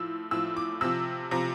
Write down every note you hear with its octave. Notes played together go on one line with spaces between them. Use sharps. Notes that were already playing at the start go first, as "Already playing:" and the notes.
Already playing: A2 F3 E6
A2 F3 E6
D6
C3 F3 E6
C3 F3 A#5